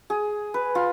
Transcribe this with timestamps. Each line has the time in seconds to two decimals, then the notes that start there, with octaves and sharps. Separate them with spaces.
0.10 G#4
0.54 B4
0.75 F4